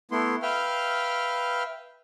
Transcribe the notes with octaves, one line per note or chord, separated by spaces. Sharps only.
A3 B3 E4 C6
B4 E5 F5 G5 F6